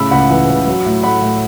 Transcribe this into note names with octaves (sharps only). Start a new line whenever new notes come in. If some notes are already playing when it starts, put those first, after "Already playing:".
Already playing: A2 C#3 B5 E6
C#2 F#5 B5
E3
C#2
F#3
A2
A3 F#5 B5
A2